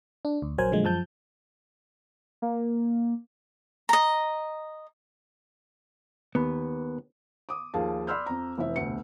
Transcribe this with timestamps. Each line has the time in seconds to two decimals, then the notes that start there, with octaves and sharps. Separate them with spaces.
0.25 D4
0.42 D2
0.58 A#1 F#3 A#4 C5 G#5
0.72 A#2 D3 F3 F#3 G#3
0.84 F#2 F3 A5 G6
2.42 A#3
3.89 D#5 A#5
6.35 D#2 B3 B4
7.49 D6 D#6
7.74 D#2 F3 G#4 F5 A5
8.07 D5 B5 C6 E6 F6 G6
8.26 F2 A#5
8.58 F1 E3 E5
8.76 F1 D2 B2 C#7